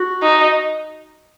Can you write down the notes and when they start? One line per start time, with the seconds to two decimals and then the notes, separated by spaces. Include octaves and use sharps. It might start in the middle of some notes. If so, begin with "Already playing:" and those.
Already playing: F#4
0.23 D#4